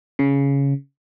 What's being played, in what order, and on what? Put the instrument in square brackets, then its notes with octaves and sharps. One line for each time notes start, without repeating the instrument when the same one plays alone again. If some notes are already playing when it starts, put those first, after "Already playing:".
[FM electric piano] C#3